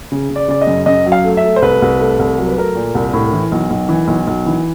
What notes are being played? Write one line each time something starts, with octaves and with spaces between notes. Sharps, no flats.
C#3
C#3
D5
C#3 D5
D#5
F#2
F#2 D#5
F#3
F5
A3
E5
A3
C5
C2 B4
C2
A3
C2
F#3 A#4
B4
A3 A#4
A#2
C2
A2
E3
B1
B1
E3
B1
B1
E3